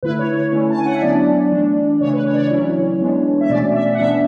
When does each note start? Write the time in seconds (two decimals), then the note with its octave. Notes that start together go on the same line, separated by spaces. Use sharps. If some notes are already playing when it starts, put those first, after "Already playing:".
0.03 D3 A3 E4 B4
0.19 C#5
0.35 C#5
0.52 D3 A3 C#4 E4
0.70 A5
0.78 G#5
0.86 F#5
0.94 E5
1.02 F#3 B3 D4 D5
1.52 E3 A3 D4
2.01 C#3 E3 A3 D4 C#5
2.14 B4
2.26 C#5
2.33 D5
2.38 C#5
2.51 F#3 C#4 E4
3.00 E3 G#3 B3 D4
3.41 E5
3.50 B2 A3 C#4 D5
3.74 E5
3.94 F#5
3.99 E3 B3 D4 E5